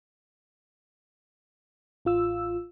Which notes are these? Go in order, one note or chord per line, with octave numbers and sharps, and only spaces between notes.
A1 F4 E6